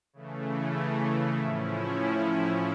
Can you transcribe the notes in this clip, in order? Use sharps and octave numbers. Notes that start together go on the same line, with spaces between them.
C#3 E3 A3
A2 F3 C#4 E4